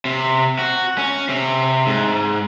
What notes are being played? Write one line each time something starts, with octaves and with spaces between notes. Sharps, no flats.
C3
F#4
C#4
C3
G#2